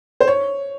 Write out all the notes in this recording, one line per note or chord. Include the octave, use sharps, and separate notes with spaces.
C5
C#5